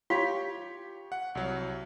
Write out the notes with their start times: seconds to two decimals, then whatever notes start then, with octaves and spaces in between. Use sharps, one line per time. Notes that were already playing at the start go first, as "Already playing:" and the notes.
0.10 F4 G4 C#5 F5 C6
1.12 F#5
1.35 C2 F#3